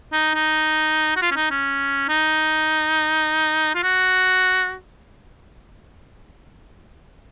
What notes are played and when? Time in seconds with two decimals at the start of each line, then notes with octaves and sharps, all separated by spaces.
0.13 D#4
0.35 D#4
1.17 F#4
1.22 F4
1.31 C#4
1.36 D#4
1.51 C#4
2.09 D#4
3.75 F4
3.83 F#4